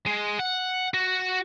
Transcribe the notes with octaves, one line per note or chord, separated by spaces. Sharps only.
G#3
F#5
F#4